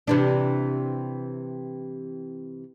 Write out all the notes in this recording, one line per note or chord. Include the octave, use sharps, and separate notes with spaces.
C3 E3 D4